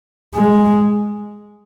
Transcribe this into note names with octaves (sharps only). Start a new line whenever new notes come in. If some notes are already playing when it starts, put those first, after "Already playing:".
G#3